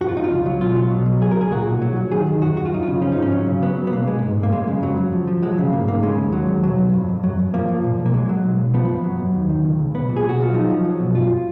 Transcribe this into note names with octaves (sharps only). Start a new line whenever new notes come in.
F2 F#4
F4
F2 D#4
F4
C#2
F#3
B2 F4
F#3
B2
F#3
C#2 G#4
A#4
C#2 G#4
A#2 F#4
B1
F#3
F#3
D#3 G#4
D#3
F#2 F#4
F#2 F#4
F4
F#2 D#4
F4
C#3
F3 C#4
D#4
G#2
C#4
F#3
C#3
F#3 B3
F#3
B3
B1 A#3
B1 G#3
G#2
G#2
A#3
F#2 G#3
C#3 G#3
F2 F#3
F#3
F3
F3
F#3 G#3
C#3
G#2 A#3
G#2 A#3
C#3 G#3
D#2
F#3
D#2
B1 F#3
B1
F2
F2
F#2 F#3
F#2
F3 A#3
F3
A#2
B1
A#3
F#3 G#3
F#3
B1
B1
F3 B3
F#2
F#3
F#2
D#2
D#3
C#2
C#2
B1 B3
A#2
G#4
B1 F#4
F#3 F4
F3 D#4
F3
F#3
B2
F#2 F4